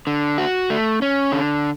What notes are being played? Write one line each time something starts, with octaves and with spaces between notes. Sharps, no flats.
D3
F#4
A3
C#4
D3